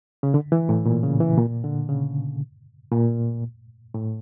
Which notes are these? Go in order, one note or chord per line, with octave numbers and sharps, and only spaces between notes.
C#3
D3
E3
A2
A#2
C#3
E3
A#2
D3
C#3
A#2
A2